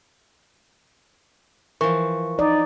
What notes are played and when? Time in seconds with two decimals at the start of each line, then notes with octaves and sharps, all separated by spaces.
1.81 E3 F3 A#4 C#6
2.39 D#4 D5